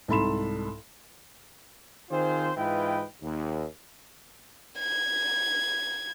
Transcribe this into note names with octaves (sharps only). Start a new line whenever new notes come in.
C2 G#2 A4 B5 C6 E7
D#3 C4 F4 G#4 C5
G#2 E3 F4 B4 D#5 G5
D#2
G#6